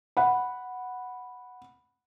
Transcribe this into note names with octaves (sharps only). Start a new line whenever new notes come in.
F#5 B5